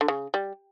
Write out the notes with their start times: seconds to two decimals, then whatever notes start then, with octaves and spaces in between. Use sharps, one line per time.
0.01 D3
0.08 C#3
0.34 G3